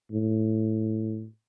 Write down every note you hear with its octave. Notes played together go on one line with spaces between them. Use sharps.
A2